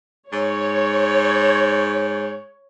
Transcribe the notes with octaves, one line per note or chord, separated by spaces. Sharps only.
G#2 C#5